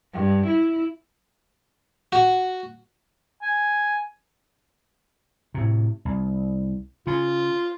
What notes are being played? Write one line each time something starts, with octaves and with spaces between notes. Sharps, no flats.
G2
E4
F#4
G#5
A2 C3
C2
C#3 F4